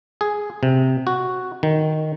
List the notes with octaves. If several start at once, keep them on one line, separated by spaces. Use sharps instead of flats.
G#4
C3
F#4
D#3